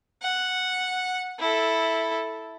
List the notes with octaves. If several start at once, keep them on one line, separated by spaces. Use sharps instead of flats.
F#5
E4 A4